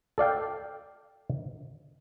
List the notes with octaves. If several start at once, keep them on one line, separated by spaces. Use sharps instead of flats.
A4 D5 F5 G5